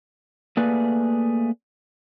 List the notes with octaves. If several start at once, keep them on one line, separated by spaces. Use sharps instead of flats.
A3 A#3 G#4 B4 D5